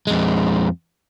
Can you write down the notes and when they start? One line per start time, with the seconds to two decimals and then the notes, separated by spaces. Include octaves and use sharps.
0.07 F2 G#3